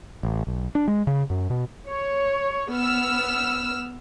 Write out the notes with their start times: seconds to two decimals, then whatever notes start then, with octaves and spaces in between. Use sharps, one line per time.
0.23 A1
0.47 B1
0.75 D4
0.88 G#3
1.07 C#3
1.30 F#2
1.50 B2
1.88 C#5
2.70 B3 E6 F6